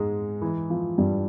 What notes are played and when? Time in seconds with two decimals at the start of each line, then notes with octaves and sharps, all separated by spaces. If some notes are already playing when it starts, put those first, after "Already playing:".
Already playing: G#2 G#3
0.41 E3
0.70 F3
0.98 G2 G3